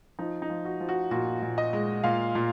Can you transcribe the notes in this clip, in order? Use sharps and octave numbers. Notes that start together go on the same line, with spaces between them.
F3 D#4
D#4
F3
F#4
F3
F#4
A#2 F#4
A#2
D#5
G#3
A#2 F5
A#2